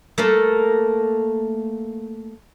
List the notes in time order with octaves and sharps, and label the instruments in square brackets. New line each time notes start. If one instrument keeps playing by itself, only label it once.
[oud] A3 A#3 A4